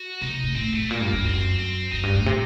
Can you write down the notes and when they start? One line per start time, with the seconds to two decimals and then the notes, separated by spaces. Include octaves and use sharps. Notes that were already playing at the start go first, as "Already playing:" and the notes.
Already playing: F#4
0.21 C3 D#4
0.44 A2
0.56 A2 C4
0.73 A2 A3
0.90 A#2 A#3
1.01 G2
1.13 F#2
1.24 F#2 C4
1.59 C4
1.92 F#2 D#4
2.03 G2
2.15 A2
2.26 C3